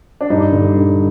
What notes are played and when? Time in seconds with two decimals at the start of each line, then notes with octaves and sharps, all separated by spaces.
0.21 D4
0.30 G2 D#4
0.53 D3
0.76 D3